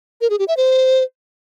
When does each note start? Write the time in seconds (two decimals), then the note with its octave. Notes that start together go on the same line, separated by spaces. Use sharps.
0.21 A#4
0.30 G#4
0.39 G4
0.48 E5
0.57 C5